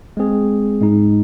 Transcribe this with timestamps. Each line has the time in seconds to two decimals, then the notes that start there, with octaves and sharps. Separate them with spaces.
0.17 G#3 C4 G#4
0.81 G#2 G#3 D#4